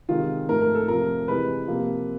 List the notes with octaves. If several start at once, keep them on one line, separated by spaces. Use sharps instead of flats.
C3 D#3 G#3 F4
G#2 F3 A3 A#4
A#4
A4
F2 C3 F3 A3 A#4
C3 E3 G#3 B4
C3 F3 A#3